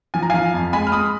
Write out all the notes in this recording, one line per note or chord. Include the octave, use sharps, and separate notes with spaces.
F3 G#5
A#5
F3 F5 G#5
F2
G#3 G#5 B5
F6
G#3 B5 D#6